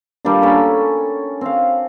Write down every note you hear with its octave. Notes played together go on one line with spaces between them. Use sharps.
G3 A#3 D4
C#4 A4 B5
C4 F5